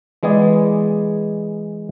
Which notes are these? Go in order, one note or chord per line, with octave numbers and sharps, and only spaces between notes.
E3 G#3 B3 G#4 D5